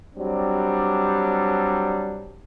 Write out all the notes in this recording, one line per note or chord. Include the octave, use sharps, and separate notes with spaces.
F#3 G3 C4 D4